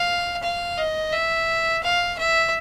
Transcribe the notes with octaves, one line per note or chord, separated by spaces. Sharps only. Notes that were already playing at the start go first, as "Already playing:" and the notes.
Already playing: F5
F5
D#5
E5
F5
E5